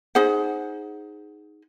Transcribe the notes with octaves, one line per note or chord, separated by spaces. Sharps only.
D#4 G#4 C5 F#5